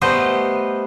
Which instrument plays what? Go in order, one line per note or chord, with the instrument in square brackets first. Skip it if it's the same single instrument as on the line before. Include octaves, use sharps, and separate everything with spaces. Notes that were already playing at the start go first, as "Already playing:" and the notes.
[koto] G3 A3 B3 C5 D#5